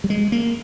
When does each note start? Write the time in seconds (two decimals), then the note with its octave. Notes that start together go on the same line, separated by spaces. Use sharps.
0.04 G3
0.10 G#3
0.32 A#3